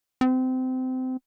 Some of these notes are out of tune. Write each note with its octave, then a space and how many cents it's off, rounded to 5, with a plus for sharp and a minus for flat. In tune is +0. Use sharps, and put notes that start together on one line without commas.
C4 -25